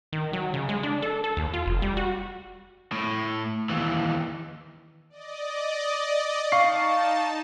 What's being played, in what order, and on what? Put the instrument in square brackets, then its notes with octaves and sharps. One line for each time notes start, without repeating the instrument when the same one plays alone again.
[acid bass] D#3
F#3
C#3
G#3
D4
A4
A4
D#2
F4
F1
G3
F#4
[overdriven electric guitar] A2
D#2 E3
[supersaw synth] D5 D#5
[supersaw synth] D#4 A5 [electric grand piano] F5 C#6 C7